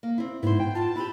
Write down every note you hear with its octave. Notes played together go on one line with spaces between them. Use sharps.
A#3
C4 E4
G#2 B3 E4 C5
G5
F4 A5
E4 G4 B5